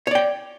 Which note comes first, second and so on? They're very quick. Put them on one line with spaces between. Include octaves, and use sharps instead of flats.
C#5 D5 G5